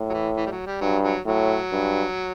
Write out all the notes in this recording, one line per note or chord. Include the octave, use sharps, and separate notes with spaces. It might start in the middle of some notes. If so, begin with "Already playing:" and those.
Already playing: A2
F#3
E3
E3
G3
F#3
G3
G2 F#3
F#3
A2 F#3
G2